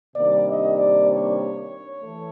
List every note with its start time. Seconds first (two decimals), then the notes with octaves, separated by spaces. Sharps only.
0.16 C3 D#3 G3 A#3 D4 D5
0.46 D#5
0.77 D5
1.08 C#5
1.99 E3 A3